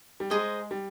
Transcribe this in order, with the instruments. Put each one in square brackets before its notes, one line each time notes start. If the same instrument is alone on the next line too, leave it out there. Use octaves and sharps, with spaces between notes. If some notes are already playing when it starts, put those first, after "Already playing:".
[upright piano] G3
[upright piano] G#3 [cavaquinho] G#4 C5 D#5 A#5
[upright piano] G3